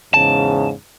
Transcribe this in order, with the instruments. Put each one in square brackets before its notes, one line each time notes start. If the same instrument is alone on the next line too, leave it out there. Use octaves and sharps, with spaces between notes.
[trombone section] E2 G#2 C#3 [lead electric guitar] A5